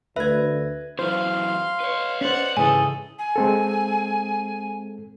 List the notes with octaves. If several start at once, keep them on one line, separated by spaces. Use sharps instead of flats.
D2 B4 E5 G#6
F#2 E3 C5 F5 C6
B4 C#5
C#4 C5 D5 F#5
G#2 C#3 E3 G#4 A4 G#5
G#5
G#3 C4 A4